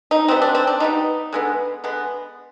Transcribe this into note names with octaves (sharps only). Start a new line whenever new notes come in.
D#4
B2 G3 B3 C4
D4
C4
D4
B2 G3 B3 D#4
D3 G#3 B3
D3 G#3 B3